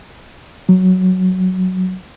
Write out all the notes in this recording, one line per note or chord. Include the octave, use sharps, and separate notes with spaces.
F#3